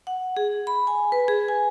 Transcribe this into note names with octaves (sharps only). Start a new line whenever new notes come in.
F#5
G#4
B5
G#5
B4
G#4
G#5